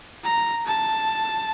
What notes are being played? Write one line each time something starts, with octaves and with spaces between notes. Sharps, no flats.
A#5
A5